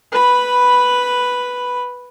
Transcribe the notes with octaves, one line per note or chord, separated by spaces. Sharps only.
B4 B5